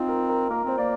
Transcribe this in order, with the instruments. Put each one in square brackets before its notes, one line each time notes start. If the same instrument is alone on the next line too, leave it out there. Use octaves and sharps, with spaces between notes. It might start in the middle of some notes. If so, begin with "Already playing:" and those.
Already playing: [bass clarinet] C4 [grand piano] D#4 F4
[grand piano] A#4
A#4
[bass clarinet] A#3 [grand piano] A#4
[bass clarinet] C4 [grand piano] C5
[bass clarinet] A#3 [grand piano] D5